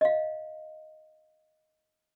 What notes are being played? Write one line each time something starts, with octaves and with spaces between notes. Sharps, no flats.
D#5 F5